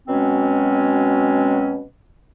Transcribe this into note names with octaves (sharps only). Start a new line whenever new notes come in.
B2 F#3 G#3 C4 C#4